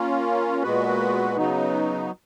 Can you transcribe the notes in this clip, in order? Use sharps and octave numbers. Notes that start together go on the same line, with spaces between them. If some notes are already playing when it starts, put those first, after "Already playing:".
Already playing: A#3 C#4 F4
A#2 G#3 B3 F#4 B4
C#3 F#3 B3 D#4